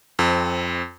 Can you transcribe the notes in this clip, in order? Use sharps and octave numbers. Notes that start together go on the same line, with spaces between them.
F2 C4